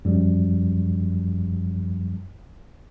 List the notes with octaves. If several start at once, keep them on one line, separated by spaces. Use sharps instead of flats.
F#2 F3 G3